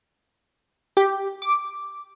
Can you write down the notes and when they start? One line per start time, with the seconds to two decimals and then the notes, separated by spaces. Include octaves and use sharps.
0.97 G4
1.42 D6